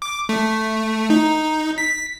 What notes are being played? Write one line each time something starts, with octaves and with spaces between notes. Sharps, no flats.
D6
A3
D#4
B6